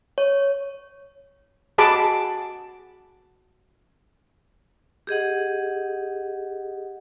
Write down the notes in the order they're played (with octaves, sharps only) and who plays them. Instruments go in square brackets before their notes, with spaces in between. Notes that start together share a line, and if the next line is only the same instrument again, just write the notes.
[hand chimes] C#5
[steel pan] F#4 G#4 A5 B5 D6
[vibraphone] G4 G#4 D#5 F#5